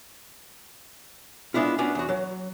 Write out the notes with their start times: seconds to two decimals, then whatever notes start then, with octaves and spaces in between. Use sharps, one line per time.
1.54 G#3 B3 D4 E4 F4
1.78 B3 C#4 D4 F#4
1.95 E2 F#4
2.09 F#3